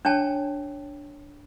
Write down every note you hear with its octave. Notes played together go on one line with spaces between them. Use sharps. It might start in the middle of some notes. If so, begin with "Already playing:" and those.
D4 C#5 G5 A5